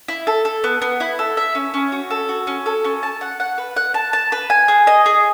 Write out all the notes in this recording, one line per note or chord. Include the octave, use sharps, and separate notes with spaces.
E4
A4
A4
B3
B3
E4
A4
E5
C#4
C#4
F#4
A4
F#4
C#4
A4
C#4
A5
F#5
F#5
B4
F#5
A5
A5
B4
G#5
G#4
D#5
G#4